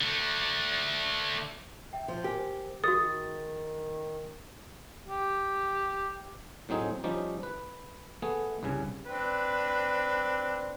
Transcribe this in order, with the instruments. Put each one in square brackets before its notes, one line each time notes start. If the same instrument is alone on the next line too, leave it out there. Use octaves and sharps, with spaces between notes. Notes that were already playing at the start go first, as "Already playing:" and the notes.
[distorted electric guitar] D3 A3
[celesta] E5 G5
[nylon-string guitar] F3
[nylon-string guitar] G4 [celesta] A#4 C5 G#5
[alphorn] D#3 [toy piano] F#4 G#4 [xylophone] D#6 [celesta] A6
[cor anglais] G4
[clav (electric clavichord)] A2 F#3 C4 D#4 G#4
F3 G3 C#4 D#4 G4
B4
A3 B3 G#4
C2 G2 C#3 G#5
[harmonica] C4 D4 B4